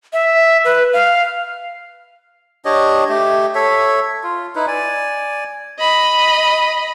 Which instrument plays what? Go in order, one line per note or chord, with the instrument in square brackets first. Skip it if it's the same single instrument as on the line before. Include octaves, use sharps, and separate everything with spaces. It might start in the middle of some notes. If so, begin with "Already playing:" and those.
[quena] E5
B4
F5
[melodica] D4 G4 C#5 D#5
A3 G4
A4 C#5 E5
F4
D#4 E4 B4
D5 G#5
[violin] D#5 B5